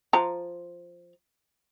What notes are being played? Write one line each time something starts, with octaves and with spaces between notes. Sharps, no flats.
F3 A#5